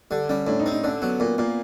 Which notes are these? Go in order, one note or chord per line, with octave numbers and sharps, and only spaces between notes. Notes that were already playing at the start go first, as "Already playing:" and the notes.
D3 G3
G3 C#4
A2 D4
D#4
C4
D#4
D3 C#4
F#3 B3
A#2
A#2 A#3